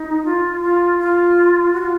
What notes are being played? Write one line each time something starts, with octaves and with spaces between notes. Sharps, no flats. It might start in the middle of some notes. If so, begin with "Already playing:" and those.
Already playing: D#4
F4
F4
F4
F#4
F4